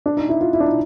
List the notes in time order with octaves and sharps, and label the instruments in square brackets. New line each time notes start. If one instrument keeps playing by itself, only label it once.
[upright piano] D4
D#4
E4
F4
E4
D4
D#4